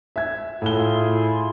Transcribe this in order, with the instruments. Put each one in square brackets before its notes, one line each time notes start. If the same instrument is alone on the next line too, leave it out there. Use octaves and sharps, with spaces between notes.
[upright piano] E5 G#6
[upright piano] A2 G7 [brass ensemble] E4 F4 G#4